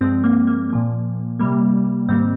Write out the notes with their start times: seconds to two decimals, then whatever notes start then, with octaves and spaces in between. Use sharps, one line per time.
0.01 G2 F3 G#3 C4
0.24 A#3
0.47 A#3
0.70 A#2 F3 A#3
1.39 C3 G3 A#3
2.08 G#2 D#3 G3 A#3 C4